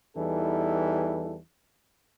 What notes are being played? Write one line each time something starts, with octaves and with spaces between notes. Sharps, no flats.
E2 E3 G3 D#4 A4